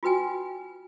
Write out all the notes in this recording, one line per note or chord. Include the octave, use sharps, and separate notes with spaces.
F4 F#4 B4 G5 G#5